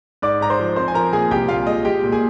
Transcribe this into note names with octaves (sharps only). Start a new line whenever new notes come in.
G#2 D5 D6
G#2 A#5
C5 C6
F3
C4 C5 C6
G#5
F3 A#4 A#5
A#2 G#4 G#5
C2 G4 G5
A#2 F4 F5
G#3 D#5
G#3 G4 G5
A#2
G#4 G#5